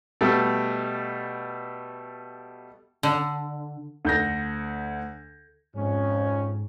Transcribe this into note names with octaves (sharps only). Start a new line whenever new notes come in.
B2 G3 A3
D3
D2 G6 A#6
F2 G#2 C#4